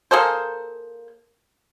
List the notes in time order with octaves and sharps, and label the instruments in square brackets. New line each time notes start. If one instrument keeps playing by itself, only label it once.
[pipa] A#3 G#4 A4 C5